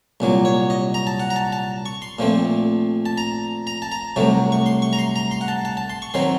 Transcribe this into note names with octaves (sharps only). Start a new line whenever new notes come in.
C2 A#2 F#3
C#5
D#5
A#5
A5
F#5
A#5
A5
A5
C#6
C6
A#2 F3 A3 C4
A5
A#5
A#5
A5
A#5
C2 C3 F#3 A3
C#6
C6
C#6
A#5
C6
A#5
C6
F#5
A5
A5
A5
C6
C#6
D#3 F#3 C4 C6